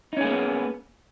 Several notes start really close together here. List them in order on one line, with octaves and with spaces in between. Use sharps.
D#4 C#4 G#4 A#3 B3